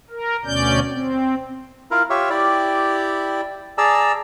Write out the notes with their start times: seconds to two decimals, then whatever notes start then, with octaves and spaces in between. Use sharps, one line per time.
0.10 A#4
0.45 D2 B2 C#4 D5 G6
0.90 C4
1.91 E4 F4 A#4
2.10 F4 G4 C#5 E5
2.30 E4 G4 D5
3.78 G#4 D5 A5 A#5 E6